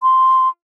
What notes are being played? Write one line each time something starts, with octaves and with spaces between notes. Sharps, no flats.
C6